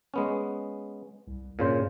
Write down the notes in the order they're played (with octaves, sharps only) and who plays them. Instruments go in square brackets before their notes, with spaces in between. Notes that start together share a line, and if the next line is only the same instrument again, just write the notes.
[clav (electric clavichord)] G#3 B3 C#4
[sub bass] C2
[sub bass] G2 [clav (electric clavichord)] A#2 C#3 C5